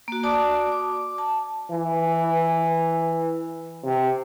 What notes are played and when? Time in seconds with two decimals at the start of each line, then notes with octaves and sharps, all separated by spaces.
0.08 A#3 F#4
0.23 F#4 D5 A5 D6 D#6
0.72 D6
1.18 A5
1.72 E3
3.84 C3